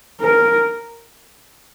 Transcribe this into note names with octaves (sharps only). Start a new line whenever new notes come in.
A#4